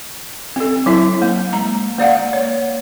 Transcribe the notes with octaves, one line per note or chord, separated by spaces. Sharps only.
C4 A4
F#3 E4 E5
A#3
G#3 A#5
A#3 D5 F5 F#5
C#5